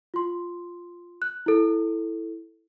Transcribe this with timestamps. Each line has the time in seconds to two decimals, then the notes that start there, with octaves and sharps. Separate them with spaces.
0.14 F4 C6
1.22 F#6
1.46 E4 A4